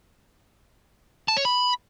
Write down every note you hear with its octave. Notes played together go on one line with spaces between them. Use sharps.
A5
C#5
B5